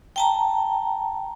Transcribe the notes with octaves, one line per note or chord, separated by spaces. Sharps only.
G5 A5 A#5